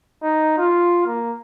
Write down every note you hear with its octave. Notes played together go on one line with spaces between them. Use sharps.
D#4
F4
A#3